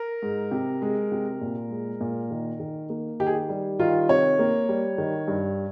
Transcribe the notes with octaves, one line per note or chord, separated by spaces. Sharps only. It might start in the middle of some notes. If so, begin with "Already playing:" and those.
Already playing: A#4
G#2
C3
G#3
C3
A#2
G#3
A#2
D#3
D#3
A#3
D#3 G4
G#4
G4
G3
D#3 F4
C3 C#5
A#3
G3
D#3
G2